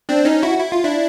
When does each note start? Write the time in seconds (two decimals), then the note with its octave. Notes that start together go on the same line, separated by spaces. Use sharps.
0.09 C4 D4
0.25 C#4 D#4
0.43 E4 F#4
0.59 E4
0.72 F4
0.84 D4 E4